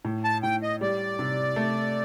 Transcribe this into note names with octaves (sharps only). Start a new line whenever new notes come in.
A2
A5
A2 G5
D#5
G3 D5
C3
A3